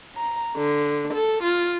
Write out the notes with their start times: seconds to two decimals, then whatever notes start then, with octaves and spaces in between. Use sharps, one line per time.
0.16 A#5
0.57 D3
1.14 A4
1.43 F4